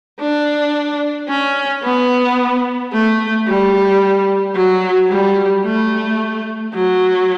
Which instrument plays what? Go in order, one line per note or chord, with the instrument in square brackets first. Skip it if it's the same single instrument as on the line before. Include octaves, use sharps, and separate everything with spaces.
[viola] D4
C#4
B3
A3
G3
F#3
G3
A3
F#3